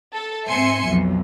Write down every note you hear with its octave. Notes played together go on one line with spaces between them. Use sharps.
A4
G#2 C4 E5 G#5 C6 C#7
B1 F2